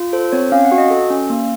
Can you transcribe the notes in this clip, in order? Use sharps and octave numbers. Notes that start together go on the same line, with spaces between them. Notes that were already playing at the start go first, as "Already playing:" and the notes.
Already playing: F4
A4 C5
C4 C#5
C#4 F5
F#5
F#4
D#5
A4
C#4
A#3